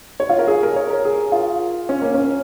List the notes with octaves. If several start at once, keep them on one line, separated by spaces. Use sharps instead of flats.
C#5
F4
A#4
G#4
A#4
C#5
A#4
G#4
F4
C#4
A#3
C#4